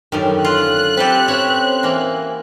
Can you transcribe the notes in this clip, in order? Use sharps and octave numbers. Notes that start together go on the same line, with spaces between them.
F#2 D3 D#3 G3 C#4
F4 F#6
C4 G4 A4 B4
C#4 B4 C#5 E5
E3 A#3